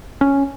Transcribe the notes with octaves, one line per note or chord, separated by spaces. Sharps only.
C#4